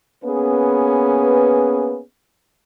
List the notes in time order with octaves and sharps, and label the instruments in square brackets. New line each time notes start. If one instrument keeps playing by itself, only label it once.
[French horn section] A#3 B3 C#4 G#4 B4